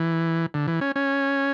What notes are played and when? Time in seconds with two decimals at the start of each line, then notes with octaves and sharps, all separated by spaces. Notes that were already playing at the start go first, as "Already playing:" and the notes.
Already playing: E3
0.54 D3
0.68 E3
0.81 C#4
0.96 C#4